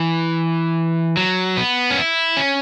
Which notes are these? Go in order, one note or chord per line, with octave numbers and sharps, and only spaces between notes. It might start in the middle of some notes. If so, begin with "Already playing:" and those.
Already playing: E3
F#3
B3
C#4
E4
C#4